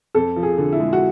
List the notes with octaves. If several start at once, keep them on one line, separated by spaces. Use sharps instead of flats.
F2 A4
F3
G#4
D3
E4
G#3
F#4